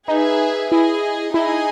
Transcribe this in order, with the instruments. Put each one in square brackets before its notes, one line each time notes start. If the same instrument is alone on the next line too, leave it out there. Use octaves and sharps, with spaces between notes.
[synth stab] D#4 [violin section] G#4 B4 E5 G#5
[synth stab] E4 [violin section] G#4 D#5 G#5
[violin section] D#4 G#4 D#5 G#5 [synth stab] E4